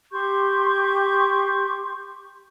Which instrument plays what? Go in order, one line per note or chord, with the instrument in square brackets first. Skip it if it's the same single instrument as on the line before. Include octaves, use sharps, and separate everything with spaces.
[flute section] G4 C6 C#6 G6